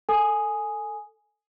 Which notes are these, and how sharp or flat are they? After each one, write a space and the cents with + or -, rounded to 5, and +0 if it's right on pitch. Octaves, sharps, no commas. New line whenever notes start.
A4 +15 G#5 +5 D#6 +0